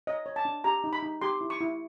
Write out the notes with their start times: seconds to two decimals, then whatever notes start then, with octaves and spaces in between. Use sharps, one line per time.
0.07 C#5 D#5
0.26 C#5
0.36 A5
0.45 D4
0.64 G4 A#5
0.84 D#4
0.93 B5
1.02 D#4
1.22 G4 C6
1.41 E4
1.50 C#6
1.60 E4